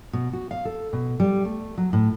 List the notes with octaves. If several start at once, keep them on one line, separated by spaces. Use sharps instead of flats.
B2
F#4
F5
A4
B2
G3
A3
F#3
A2